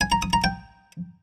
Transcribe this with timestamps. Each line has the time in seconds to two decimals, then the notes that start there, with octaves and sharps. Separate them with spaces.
0.01 G#5
0.12 A#5
0.22 D#6
0.33 A#5
0.44 G5